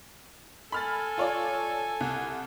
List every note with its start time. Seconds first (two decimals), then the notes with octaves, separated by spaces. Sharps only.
0.72 A4 G#5 B5 F6 A6
1.18 F4 C#5 D5
2.00 C2